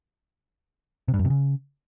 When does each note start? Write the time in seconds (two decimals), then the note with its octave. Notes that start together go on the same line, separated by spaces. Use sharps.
1.08 C3
1.14 G2
1.19 F#2
1.25 C3
1.30 C#3